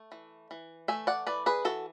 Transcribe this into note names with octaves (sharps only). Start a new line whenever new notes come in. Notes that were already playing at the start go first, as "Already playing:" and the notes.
Already playing: A3
E3
E3
A3 E5 G#5
D5 F#5
E3 B4 D5
G#4 B4
E3 F#4 A4